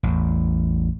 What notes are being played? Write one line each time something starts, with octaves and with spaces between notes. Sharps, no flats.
A1 E2